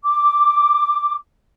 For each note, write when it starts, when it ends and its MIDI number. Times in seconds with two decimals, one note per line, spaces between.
0.04 1.14 86